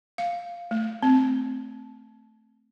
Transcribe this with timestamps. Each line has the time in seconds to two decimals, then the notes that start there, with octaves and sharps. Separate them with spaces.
0.18 F5
0.71 A3
1.03 C4